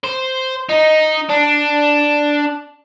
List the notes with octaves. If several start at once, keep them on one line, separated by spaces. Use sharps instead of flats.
C5
D#4
D4